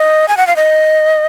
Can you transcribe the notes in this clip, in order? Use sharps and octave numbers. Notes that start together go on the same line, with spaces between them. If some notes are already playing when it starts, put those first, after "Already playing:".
Already playing: D#5
G#5
F#5
F5
D#5